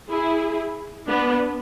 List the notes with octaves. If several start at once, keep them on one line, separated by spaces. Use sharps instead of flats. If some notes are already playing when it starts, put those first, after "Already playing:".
E4 G#4
B3 D4